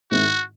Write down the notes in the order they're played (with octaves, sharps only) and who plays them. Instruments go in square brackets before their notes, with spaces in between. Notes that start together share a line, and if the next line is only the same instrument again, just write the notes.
[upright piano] G#2 D#3 G#3 C4 E4 [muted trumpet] F#4